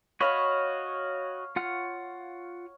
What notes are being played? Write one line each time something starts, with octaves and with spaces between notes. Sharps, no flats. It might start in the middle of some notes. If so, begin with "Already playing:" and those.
F#4 C#5 D#5 F5 B5 C#6
F4 F#5 F6